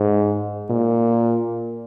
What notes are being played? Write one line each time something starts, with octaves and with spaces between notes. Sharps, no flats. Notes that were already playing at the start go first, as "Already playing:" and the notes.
Already playing: G#2
A#2